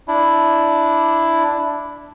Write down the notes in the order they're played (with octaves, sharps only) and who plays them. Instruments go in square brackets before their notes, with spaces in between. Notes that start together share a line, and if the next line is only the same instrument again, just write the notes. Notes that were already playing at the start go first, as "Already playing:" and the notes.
[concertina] D4 E4